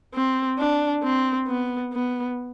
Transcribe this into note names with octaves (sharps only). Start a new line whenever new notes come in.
C4
D4
C4
B3
B3